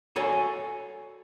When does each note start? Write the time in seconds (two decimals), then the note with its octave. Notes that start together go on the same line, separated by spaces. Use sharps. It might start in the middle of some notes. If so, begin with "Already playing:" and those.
0.16 F#4 A4 C#5 D5 G#5